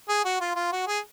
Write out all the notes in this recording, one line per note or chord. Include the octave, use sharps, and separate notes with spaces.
G#4
F#4
F4
F4
F#4
G#4